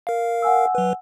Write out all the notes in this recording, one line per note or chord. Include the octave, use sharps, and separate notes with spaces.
A#4 F5
F#5 G#5 E6
F#3 B4